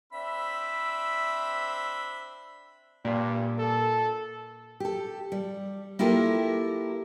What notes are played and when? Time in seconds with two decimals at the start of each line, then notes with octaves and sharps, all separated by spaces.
0.13 C4 D4 E5 B5 E6
3.05 G2 A#2
3.59 A4
4.80 G4 A4
5.32 G3
5.99 A#3 E4 F4 G4 A4 A#4